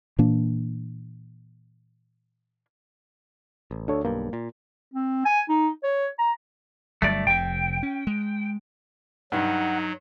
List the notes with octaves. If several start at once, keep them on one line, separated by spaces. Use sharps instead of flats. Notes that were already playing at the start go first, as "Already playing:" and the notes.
A#2 E3 A#3 D4
A1
D2 D4 A4 C#5
B1 G2 A#3
A#2
C4
G#5
D#4
C#5
A#5
G1 G2 F#3 A3 D5
F1 C3 G5
C#4
G#3
G2 F#3 D#4 F#5